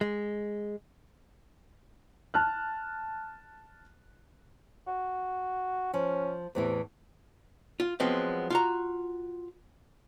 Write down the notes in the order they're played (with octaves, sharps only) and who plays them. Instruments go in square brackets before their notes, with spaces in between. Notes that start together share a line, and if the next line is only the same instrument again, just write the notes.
[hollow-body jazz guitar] G#3
[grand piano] A5 F6 F#6
[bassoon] F#4
[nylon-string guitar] F3 [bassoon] C#4
[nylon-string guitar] E2 A2 E3 [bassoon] C3
[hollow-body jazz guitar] F4
F3 F#3 G#3 B3 C4
F4 F#4 A#5